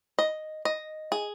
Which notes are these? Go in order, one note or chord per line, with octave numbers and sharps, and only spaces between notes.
D#5
D#5
G#4